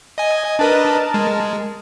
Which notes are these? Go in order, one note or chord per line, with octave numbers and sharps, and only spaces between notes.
D#5 G#5
D4 A#4 B4 D#5 A5
G#3